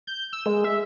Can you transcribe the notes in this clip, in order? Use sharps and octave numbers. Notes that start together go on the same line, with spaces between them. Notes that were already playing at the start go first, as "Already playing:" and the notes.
G6
E6
G#3
E5